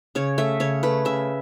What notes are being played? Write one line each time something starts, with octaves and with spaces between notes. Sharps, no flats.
C#3 C#5
A3 E5
C#3 C#5
A3 B4
C#3 E5